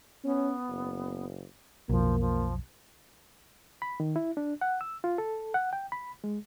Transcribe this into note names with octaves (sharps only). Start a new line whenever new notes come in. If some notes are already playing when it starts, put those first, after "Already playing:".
B3 C#4
F#1
B1 F2 F3 A#3
F3
B5
D#3
E4
D4
F#5
E6
F4
A4
F#5
G5
B5
G#3